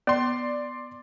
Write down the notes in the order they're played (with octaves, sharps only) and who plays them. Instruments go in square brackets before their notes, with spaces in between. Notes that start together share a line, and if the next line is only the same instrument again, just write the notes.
[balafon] B3 [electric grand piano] D5 C6